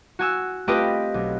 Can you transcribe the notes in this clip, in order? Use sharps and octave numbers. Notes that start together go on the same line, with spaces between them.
F#4 G#5 E6
A3 C4 F4 G4 B4 D#5
B1